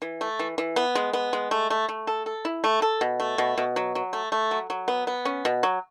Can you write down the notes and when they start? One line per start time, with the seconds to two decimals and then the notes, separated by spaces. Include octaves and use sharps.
0.02 E3
0.21 A3
0.39 E3
0.58 E3
0.76 B3
0.95 G#3
1.13 B3
1.33 G#3
1.51 A3
1.70 A3
1.89 A3
2.07 A4
2.26 A4
2.45 E4
2.64 A3
2.82 A4
3.01 B2
3.20 A3
3.38 B2
3.58 B2
3.76 F#3
3.95 F#3
4.13 A3
4.32 A3
4.51 F#3
4.70 F#3
4.88 B3
5.07 B3
5.25 C#4
5.45 B2
5.63 F#3